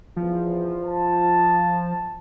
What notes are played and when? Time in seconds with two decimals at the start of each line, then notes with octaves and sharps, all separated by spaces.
0.16 E2 F3
0.84 A5